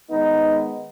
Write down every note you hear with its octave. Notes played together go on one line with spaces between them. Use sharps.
D#3 G#3 B3 D#4